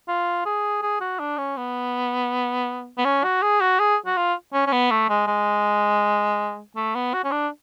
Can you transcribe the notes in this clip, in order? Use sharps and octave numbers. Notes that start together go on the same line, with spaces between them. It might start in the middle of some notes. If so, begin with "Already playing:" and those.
F4
G#4
G#4
F#4
D4
C#4
B3
B3
C#4
F#4
G#4
F#4
G#4
F#4
F4
C#4
C#4
B3
A3
G#3
G#3
A3
B3
F#4
C#4
D4